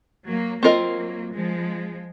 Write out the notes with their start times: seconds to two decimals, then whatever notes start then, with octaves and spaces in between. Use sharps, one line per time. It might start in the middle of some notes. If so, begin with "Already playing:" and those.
0.28 F#3 A#3
0.63 F#3 A#3 C4 F4 A#4 D#5
1.32 F3 G#3